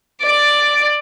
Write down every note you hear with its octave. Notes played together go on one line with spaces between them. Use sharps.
D5